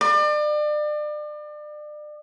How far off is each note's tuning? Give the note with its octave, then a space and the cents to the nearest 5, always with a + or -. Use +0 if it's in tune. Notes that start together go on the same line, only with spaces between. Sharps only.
D5 +35